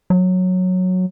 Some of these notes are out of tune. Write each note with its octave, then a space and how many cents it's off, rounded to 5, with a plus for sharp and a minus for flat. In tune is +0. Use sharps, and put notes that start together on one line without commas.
F#3 -10